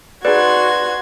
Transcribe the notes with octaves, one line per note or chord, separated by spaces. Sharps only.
D#4 F#4 G#4 B4 D5 C6 G#6